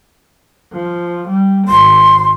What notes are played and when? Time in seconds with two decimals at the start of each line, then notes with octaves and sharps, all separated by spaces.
0.72 F3
1.28 G3
1.68 G#1 C6